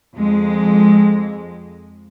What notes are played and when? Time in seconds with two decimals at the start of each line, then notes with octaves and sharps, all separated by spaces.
0.14 F2 G#3